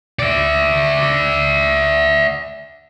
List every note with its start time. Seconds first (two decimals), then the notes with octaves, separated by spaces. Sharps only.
0.19 D5 E5